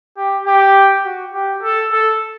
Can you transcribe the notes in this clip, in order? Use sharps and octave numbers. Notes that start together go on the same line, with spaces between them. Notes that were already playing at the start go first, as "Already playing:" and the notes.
G4
G4
F#4
G4
A4
A4